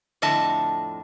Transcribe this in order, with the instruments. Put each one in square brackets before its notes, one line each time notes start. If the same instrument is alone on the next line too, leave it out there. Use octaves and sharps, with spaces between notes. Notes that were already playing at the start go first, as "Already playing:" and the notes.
[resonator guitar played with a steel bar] F2 A2 D3 D#5 E5 A5